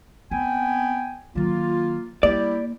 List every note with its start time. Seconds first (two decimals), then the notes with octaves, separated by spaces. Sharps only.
0.31 B3 C4 G5 G#5
1.35 D#3 F#3 A#3 F4
2.23 G3 A#3 E4 G4 D5